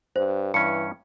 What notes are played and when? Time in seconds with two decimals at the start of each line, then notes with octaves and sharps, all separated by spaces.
0.16 G2 C5
0.54 G2 E3 C#4 C#7